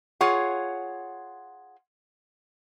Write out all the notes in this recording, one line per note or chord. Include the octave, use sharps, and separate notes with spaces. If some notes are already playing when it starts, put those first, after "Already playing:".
F4 G#4 C#5 F#5